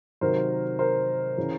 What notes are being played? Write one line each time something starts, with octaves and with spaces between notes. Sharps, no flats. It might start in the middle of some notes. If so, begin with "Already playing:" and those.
C3 D#3 F#3 A#4 C5
A#4 C5
C#3 E3